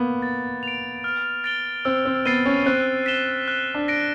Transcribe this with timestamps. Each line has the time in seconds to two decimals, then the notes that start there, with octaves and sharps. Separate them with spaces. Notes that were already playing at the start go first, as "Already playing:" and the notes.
Already playing: A#3 B3
0.22 A6
0.63 D7 F7
1.04 F6
1.44 A6 D7 G7
1.85 C4 E6
2.05 C4
2.25 B3 A6 C7 D#7 G7
2.46 C#4
2.66 C4 F#6
3.06 B6 E7 G7
3.48 F#6
3.75 D4
3.88 A#6 D7